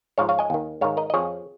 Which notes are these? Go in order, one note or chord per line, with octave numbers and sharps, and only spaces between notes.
G#2 F3 C#5 F5
C#5 F5
D#5 G#5
D#2 D#3
G#2 D#3 C#5 F5
A#4 D#5
D#5
F2 F3 G#4 C#5